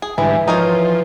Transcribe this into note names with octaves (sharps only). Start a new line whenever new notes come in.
G#4
G#2 D3 E3 G3 E4
F3 D#4 A#4 C#5